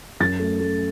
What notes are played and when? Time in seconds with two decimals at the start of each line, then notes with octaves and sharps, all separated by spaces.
0.20 F#2 A6
0.40 A3
0.60 A3